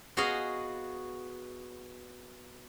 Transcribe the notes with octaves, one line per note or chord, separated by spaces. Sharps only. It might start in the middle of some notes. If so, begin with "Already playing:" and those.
B3 F#4 G#4 D#5 F5